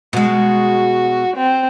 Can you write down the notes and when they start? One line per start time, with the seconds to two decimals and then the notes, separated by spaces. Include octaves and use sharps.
0.13 B2 G#3 F#4
1.37 C4